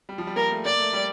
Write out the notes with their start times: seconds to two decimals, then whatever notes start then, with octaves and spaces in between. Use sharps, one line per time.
0.09 G3
0.18 F3
0.27 G3
0.36 A#3 A#4
0.51 A3
0.65 A#3 D5
0.79 A3
0.93 G3